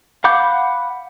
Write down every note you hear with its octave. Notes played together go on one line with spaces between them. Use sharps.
F5 F#5 B5 D6 G6